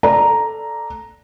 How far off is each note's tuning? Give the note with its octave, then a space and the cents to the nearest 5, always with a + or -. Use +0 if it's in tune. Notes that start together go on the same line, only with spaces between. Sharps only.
A4 +0 D5 +0 A#5 +0